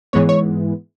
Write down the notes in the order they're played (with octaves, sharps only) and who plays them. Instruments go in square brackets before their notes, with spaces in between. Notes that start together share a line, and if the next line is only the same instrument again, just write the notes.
[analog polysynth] G#2 E3 G#3 B3 C#5
C#5